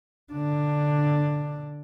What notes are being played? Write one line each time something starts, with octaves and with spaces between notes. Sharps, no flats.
D3 D4